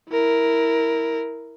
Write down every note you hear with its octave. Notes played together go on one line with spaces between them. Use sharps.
E4 A#4